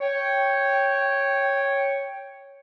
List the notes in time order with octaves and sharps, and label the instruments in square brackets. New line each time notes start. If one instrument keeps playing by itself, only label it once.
[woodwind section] C#5 G5